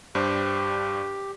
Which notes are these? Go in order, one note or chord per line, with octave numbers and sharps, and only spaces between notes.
G2 D4 G4 C5